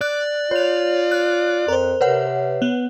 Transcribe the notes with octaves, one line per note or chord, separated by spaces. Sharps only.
D5 F#6
F4 C#5 F7
F#6
F2 A#4 C5
C3 B4 C#5 F#5
B3